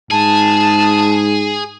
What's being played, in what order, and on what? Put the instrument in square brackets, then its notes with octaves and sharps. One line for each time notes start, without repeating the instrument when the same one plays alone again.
[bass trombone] G#2 [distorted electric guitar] G#4 [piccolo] A5